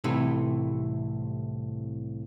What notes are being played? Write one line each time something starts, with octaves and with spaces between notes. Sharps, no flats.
C2 A2 C3 E3 A3 D#4